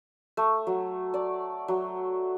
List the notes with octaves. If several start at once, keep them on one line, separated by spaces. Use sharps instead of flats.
A3
F#3
D5
F#3